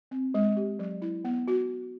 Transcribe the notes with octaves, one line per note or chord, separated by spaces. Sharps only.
C4
G#3
G4
F#3
E4
B3
F#4